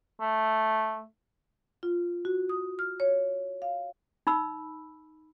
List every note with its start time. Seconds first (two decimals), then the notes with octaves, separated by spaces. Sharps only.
0.21 A3
1.83 F4
2.25 F#4
2.49 D#6
2.79 F6
3.00 C#5
3.62 F5
4.27 D#4 B5 E6